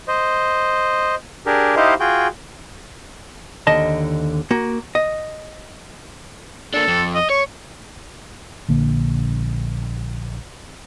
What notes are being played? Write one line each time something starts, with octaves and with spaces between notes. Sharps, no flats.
C5 D#5
D4 G4 G#4 A#4
D#4 E4 G4 C5 D#5 F5
F4 F#4 G#4 G5
D#2 D3 D#5 A5
A#3 F#4
D#5
A#3 D4 A4
F2
D#5
C#5 C#6
A#1 D3 A#3